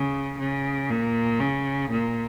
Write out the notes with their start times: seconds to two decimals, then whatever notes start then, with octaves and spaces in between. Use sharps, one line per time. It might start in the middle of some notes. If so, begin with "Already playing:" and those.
Already playing: C#3
0.39 C#3
0.90 A#2
1.40 C#3
1.91 A#2